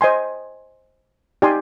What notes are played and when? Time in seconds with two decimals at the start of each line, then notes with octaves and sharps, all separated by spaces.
0.01 C5 D#5 G#5 C6
1.42 D#4 G4 D5 G#5 C6